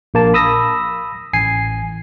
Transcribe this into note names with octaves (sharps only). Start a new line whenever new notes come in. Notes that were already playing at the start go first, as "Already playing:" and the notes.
A#1 A#3 A5
B5 D#6 E6 A#6
A1 G#5 C7